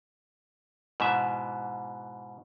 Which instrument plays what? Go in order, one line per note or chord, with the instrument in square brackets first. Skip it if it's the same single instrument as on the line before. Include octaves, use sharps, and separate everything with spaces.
[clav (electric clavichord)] G#2 B2 E3 E5